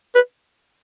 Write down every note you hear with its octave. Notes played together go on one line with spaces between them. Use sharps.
B4